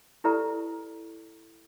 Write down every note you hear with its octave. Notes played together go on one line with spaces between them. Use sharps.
E4 G4 A4 B4 D5 A#5